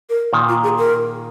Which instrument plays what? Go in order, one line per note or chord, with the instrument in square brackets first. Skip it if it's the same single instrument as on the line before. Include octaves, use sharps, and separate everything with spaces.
[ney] A#4
[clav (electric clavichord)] A#2 D#3
[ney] F4
G#4
A#4